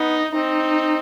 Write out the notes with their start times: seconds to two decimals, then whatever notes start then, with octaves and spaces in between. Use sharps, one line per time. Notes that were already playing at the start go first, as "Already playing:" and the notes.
Already playing: B3 D#4
0.34 C4 D#4